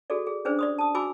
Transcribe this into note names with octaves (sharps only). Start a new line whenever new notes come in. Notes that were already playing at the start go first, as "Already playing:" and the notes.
F#4 G#4 A4 D5
G#4
C#4 D4 G#4 B4 C5 D5
D5 C6 D#6
A5 D#6
F#4 G#5 B5 D6 E6